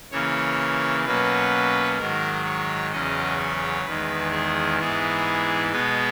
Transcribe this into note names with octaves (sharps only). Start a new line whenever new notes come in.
C#3 E3 A#3 C#5
B2 F#3 A#3 C#4 B4
G#2 D#3 F#3 A#4
C#5
E2 C#3 F#3 C#4 D#5
C#5
E2 D#3 G#3 B4
G#4
G#2 E3 B3 G#4
B2 G#3 B3 B4